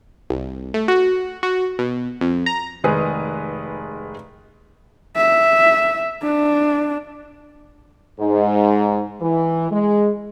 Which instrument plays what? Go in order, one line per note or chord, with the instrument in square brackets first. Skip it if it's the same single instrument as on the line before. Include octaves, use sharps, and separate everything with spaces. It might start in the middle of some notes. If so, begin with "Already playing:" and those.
[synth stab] C2
A3
F#4
F#4
B2
F2
A#5
[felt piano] F1 D#3 G#3 G#4 B4
[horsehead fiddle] E5
D4
[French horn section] G#2
E3
G#3